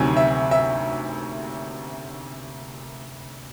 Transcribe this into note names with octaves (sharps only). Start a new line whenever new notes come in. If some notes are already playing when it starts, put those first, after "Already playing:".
Already playing: D2 C3 D#3 F#3 G#5
E5
E5